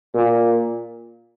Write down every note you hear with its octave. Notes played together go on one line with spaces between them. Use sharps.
A#2